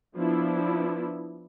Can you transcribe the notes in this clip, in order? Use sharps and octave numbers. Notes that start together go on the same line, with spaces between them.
F3 B3 D4 E4